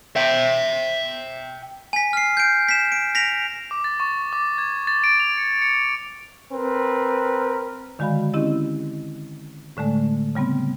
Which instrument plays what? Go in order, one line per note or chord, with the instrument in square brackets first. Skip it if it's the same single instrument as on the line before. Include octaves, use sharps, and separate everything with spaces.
[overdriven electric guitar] E5 G5
[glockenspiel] G#5 B6
F6 C7
G6 D7
B6 E7
D7
A#6 B6 D7 F7
[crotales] D6
A6
C#6
D6
G#6
A6
D7
F7
C#7
C#7
[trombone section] C4 A#4 B4
[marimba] D3 D#3 G#3 F#4 F5 B5
C4 C#4 E4 G4 D#5 E6
A2 D3 G#3 A3
C#3 G3 B3 C4